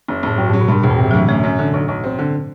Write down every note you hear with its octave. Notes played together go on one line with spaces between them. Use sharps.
F#1
F#1 A2
G2 F#3
A2 F#3
B2
G2 C3
E1 B2
A2
G2 C3
F#3
D2 E3
F#2 A3
F#2
D3
B1
B1
C4
D3